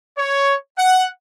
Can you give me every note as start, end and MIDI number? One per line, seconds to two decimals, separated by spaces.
0.18 0.55 73
0.79 1.08 78